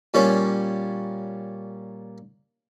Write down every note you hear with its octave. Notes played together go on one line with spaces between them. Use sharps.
A#2 G3 A#3 C#4 C#5